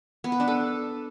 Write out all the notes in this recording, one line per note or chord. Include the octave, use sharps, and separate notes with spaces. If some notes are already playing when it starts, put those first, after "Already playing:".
B3
B4
D4
A4